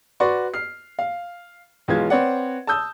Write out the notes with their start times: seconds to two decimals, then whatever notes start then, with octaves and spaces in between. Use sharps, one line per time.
0.20 F#4 B4 D5 C6 C#6
0.54 F6 C7
0.99 F5
1.88 B1 E3 G#3 F4 G#6
2.10 C4 B4 C#5 D5 F#5
2.67 A5 D#6 E6 G6